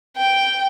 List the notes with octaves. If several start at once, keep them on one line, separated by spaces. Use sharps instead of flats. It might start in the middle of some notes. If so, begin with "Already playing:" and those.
G5